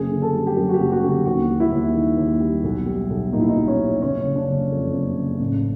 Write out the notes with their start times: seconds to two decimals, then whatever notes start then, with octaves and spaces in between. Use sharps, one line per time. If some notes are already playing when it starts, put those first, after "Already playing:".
Already playing: F#1 G#4
0.11 D3
0.22 A4
0.34 G3
0.47 G4
0.56 F#2 G#4
0.69 F#4
0.74 G4
0.80 F#1
0.92 F#4
1.03 D3
1.08 G4
1.25 D#2 F#4
1.49 G3
1.60 E4
1.72 D#2
1.95 D#3
2.17 D#2
2.40 G3
2.64 B1
2.86 G3
3.10 B1
3.32 A#2 D#4
3.41 E4
3.49 D#4
3.55 B1
3.68 C#4
3.79 G3
4.01 F#1 C#4
4.24 C#3
4.36 D4
4.47 F#1
4.71 F2
4.93 F#1
5.17 C#3
5.39 A1